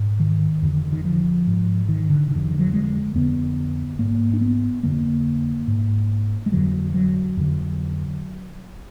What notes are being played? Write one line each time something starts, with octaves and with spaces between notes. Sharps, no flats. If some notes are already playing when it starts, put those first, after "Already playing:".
Already playing: G#2
D#3
F2 D3
D#3
F3
G#2
D#3
D3
F2 D3 D#3
D#3
F#3
G#3
F2 D3 B3
G#2 A#3
D4
B3
F2 D3 A#3
G#2
G#3
F2 D3 F#3
F#3
F2 D3